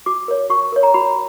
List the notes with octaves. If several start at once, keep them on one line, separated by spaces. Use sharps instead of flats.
F#4 D6
A#4 C#5
F#4 C#6
A#4 C#5
A#5
F#4 B5